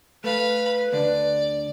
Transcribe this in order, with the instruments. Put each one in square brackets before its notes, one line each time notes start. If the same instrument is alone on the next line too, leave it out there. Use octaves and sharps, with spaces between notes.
[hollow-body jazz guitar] A3 [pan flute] B4 [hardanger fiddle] F5 B5
[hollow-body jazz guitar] D2 D3 D4 [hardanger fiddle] D5